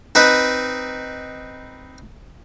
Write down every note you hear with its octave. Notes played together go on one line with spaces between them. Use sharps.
C4 D#4 B4